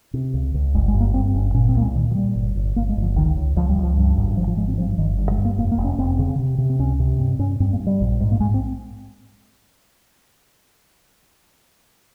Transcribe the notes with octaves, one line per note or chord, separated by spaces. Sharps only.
C3
C#2
C#2
G1 G#3
G#3
G2
A#3
G2 C4
G1 C#4
A#2 C#4
C4
C2 A#3
G#3
A#2 D#3
F3
A#2 G3
G1
G1
G1 A#3
G#3
G1
F3
C#2 D#3
C#2
C#2 F3
G3
C#2
F3
G2
G#1
G#1 F3
F3
G#1 G#3
C4
G2 F3
G1 D#3
G2
G#3
G2
A#3
F1 A#3
A#3
F1
C#4
F1 C4
C#3
C3
C3
C4
C#2 C#4
C3
G2 C4
G2 C#4
G2 C4
A#3
G2
G3
A#1
G#2
A#3
G#2 G#3
C4